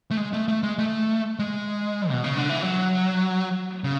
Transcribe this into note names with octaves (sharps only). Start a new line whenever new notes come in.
A3
G#3
A3
A3
G#3
A3
G#3
B2
C#3
D3
E3
F#3
C#3